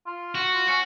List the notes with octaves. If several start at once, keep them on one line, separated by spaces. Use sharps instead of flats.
F4
F#4
F4
C#4 F#4